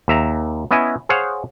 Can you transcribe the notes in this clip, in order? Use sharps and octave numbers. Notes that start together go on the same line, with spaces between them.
D#2 E5 A#5
B3 C#4 E4 D#5 G#5
G#4 C5 C#5 F5 F#5